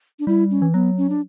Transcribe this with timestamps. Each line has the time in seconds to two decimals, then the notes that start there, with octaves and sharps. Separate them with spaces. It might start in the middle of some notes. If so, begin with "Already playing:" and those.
0.19 D4
0.27 G3 E4
0.51 C#4
0.62 E3
0.74 F#3 B3
0.98 C#4
1.09 D4